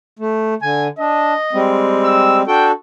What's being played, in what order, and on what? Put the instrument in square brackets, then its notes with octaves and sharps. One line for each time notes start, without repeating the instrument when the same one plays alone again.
[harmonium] A3
[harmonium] D3 [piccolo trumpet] G#5
[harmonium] D4 [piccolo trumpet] D#5
[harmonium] G3 G#3 C4
[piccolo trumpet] E6
[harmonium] D4 F#4 A4 [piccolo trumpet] G5